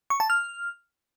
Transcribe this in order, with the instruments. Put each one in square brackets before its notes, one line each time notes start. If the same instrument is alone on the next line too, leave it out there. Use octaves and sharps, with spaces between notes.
[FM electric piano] C#6
A5
F6